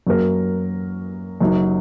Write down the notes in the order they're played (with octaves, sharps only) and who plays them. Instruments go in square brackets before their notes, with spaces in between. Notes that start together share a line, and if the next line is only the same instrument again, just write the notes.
[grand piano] F#2 F#3 A#3 F#4 A#4
F#1 F#2 F#3 D#4